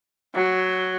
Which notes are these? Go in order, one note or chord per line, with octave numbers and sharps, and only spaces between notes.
F#3